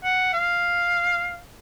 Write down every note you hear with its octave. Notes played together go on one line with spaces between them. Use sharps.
F#5
F5